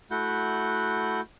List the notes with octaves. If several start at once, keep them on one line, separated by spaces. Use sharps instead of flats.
A3 E4 F#4 F#5 G6